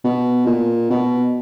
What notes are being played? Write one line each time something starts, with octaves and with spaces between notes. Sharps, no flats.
B2
A#2
B2